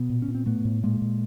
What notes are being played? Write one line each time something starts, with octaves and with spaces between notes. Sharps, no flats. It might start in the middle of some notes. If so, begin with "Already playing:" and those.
Already playing: B2 B3
A#2
C#4
A#2
C4
A2 A3 B3
A2
A#2 G#3 A#3
A#2